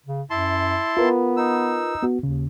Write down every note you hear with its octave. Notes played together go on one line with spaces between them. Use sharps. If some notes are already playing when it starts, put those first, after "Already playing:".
C#3
F#2 E4 A5 C6
B3 F4 A#4 B4
D#4 E6
B3 F#4
D#2 C#3